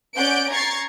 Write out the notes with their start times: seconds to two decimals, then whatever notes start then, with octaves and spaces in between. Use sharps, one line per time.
0.16 C#4 D5 F#5 G6 D7
0.51 A#5 C#6 G#6 A6 C7